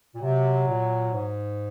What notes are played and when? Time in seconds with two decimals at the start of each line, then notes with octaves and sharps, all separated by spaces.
0.15 A#2
0.20 C3 F#3
0.67 A#2
1.11 G#2